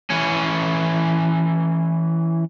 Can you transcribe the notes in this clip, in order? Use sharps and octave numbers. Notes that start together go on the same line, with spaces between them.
E3 C#4